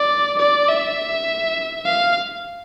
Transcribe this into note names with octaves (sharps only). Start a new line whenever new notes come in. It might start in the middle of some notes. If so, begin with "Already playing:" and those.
Already playing: D5
D5
E5
F5